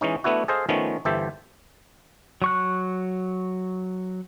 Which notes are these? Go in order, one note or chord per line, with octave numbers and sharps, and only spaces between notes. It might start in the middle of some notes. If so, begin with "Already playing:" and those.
E3 G#3 C#4 D#4
A3 B3 D4 E4 F#4
G#4 A4 C5 D#5 F5
D#3 F3 A3 B3 C#4
G1 E3 G4 A4 C5 E5
F#3 C#6 F#6